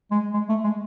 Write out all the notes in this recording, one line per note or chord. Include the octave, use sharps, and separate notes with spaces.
G#3
G#3
A3
G#3